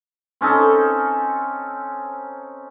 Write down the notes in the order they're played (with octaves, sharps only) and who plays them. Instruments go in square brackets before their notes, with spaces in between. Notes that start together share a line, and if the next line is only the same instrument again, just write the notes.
[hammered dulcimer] C4 C#4 D#4 A4